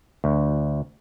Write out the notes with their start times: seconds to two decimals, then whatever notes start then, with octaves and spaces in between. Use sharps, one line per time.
0.24 D2